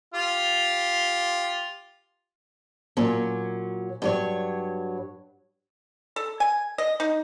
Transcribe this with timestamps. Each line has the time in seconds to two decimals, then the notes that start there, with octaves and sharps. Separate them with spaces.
0.14 F4 G4
2.97 A#2 F#3 C#4
4.02 G2 F#3 C#5
6.16 A4
6.40 G#5
6.78 D#5
7.00 D#4